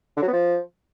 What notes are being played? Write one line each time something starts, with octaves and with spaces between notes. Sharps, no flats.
D3
F#3
B3
F3